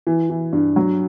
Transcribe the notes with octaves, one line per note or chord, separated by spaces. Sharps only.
E3
E3
G2
F#3